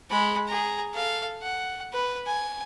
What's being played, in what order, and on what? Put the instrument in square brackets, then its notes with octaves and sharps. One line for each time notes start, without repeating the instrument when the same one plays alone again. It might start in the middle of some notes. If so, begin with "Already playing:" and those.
[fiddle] G#3 B5
G#4 A#5
A4 F5
F#5
B4
G#5